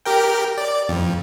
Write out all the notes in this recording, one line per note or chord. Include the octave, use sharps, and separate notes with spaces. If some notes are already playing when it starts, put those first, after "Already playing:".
G4 A#4 G5
D5
F2